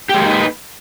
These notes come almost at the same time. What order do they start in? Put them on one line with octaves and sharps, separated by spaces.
G4 G#3 A#3 D#4 B4